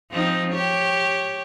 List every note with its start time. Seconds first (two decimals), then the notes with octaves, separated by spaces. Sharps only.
0.11 F3 C4 D#4
0.52 G4 C#5